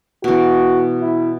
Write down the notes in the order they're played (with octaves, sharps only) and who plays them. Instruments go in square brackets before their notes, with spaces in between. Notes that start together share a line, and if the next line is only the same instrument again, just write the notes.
[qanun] B2 E3 [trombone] F#4
[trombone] E4